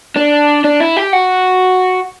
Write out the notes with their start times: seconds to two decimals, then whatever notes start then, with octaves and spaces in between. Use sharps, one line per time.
0.17 D4
0.64 D4
0.80 E4
0.97 G4
1.13 F#4